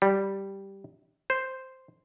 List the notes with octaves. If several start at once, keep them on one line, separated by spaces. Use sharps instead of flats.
G3
C5